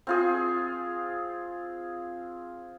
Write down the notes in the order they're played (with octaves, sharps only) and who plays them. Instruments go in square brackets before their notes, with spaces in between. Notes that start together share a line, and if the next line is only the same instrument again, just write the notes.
[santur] C4 F4 G#4